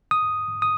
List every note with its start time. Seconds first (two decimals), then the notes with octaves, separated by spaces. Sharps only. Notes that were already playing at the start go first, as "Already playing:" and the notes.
0.11 D#6
0.62 D#6